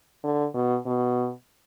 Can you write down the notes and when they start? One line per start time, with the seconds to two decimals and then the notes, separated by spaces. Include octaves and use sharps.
0.24 D3
0.55 B2
0.86 B2